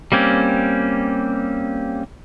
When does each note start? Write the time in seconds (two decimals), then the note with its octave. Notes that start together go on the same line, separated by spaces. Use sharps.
0.12 G3 A#3 C4 C#4